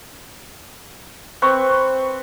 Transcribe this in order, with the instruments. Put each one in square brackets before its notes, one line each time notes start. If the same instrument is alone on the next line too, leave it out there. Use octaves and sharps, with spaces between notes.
[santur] C4 B4 C#6